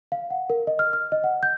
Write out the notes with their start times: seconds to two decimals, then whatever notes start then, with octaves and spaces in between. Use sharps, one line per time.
0.12 F5
0.30 F#5
0.50 A#4
0.67 D#5
0.79 F6
0.93 F6
1.12 D#5
1.24 F#5
1.43 G6